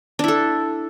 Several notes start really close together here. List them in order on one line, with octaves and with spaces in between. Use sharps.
D4 E4 A4